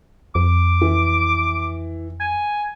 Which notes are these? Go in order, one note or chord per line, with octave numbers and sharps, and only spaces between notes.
F2 D6
E3
G#5